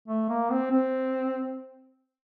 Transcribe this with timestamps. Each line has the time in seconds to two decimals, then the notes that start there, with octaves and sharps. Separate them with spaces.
0.08 A3
0.29 A#3
0.50 C4
0.72 C4